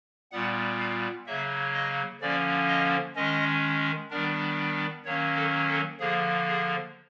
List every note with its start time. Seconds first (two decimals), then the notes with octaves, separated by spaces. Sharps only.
0.32 A#2 G3 B3 F#5
0.79 F5
1.27 C#3 F#3 A#3 E5
1.74 D#5
2.21 D3 F3 A#3 C#4 D5
2.68 D#5
3.15 D#3 G#3 C#4 D#5
4.10 D#3 G3 B3 D4 A#4
5.05 D#3 F#3 A#3 C#4 C#5
5.37 A4
5.68 A4
5.99 D3 F3 A#3 G#4
6.48 G#4